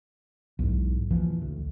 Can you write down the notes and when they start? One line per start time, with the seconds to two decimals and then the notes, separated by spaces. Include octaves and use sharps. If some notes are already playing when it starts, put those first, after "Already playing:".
0.59 B1 E2 G#2
1.10 A#1 E2 E3 F3
1.42 D2